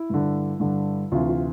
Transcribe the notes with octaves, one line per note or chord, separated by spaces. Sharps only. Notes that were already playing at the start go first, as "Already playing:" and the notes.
Already playing: E4
G2 D3
G2 D3
D2 C3 E3 F4
F4